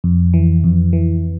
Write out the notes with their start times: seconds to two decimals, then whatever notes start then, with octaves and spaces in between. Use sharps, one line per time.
0.04 F2
0.34 E3
0.64 F2
0.93 E3